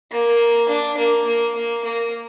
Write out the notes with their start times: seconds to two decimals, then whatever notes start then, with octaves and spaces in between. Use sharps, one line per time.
0.12 A#3
0.69 D4
0.98 A#3
1.27 A#3
1.55 A#3
1.84 A#3